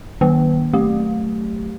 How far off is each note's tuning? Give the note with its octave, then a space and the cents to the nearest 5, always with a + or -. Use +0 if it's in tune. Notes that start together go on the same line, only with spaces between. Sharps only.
D#3 +0 A#3 +40
F#3 +15 A3 +0 G4 +0